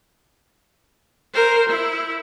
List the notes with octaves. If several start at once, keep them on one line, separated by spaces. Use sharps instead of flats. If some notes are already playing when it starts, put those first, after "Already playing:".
A#4 C5
E4